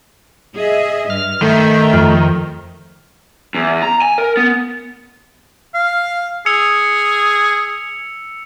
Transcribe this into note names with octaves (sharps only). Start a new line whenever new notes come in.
G#4 D#5 E5
G2 F6
D#3 A3 E5
F2 F6 G6
E2
A#5
G#5
A#4
B3
F5
G#4 E6 C#7 F7